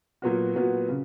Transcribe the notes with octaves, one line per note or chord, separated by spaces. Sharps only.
A#2 F#3 B3 F#4
A#2 F#3 B3 F#4
C#3